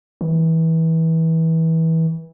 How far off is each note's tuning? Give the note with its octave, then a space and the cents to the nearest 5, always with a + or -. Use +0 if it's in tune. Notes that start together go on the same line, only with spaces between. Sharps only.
E3 -25